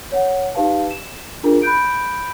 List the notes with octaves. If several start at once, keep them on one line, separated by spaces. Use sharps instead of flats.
C#5 F#5
D#4 G4 B4 F5 A5
E7
D4 F4 G#4 A#4 A#5
B5 F#6 G6 D7